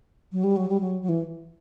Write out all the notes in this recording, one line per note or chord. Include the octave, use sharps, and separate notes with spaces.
F#3
G3
F#3
G3
F#3
F#3
E3